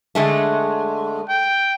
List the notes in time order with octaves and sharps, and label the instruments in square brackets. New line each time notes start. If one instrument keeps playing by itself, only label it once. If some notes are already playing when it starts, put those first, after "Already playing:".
[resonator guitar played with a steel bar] D3 G#3 A3
[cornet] G5